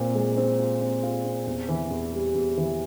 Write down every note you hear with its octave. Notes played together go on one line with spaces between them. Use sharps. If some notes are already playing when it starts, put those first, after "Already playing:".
Already playing: A#2 C4
G#3
C4
F4
C4
F4
C4
E2
E3
E2
G3
E2
E3